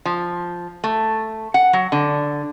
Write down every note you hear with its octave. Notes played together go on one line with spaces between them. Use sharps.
F3
A3
F#5
F#3
D3